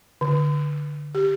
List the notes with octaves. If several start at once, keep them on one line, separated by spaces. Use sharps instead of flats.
D3
G4